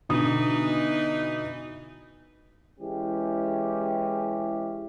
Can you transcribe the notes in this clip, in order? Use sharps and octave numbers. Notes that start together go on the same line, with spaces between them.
B2 D3 E3 D#4 D#6
E3 G#3 C#4 G4